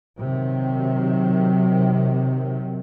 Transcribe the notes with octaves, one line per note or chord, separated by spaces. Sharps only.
C3 D#3 F#3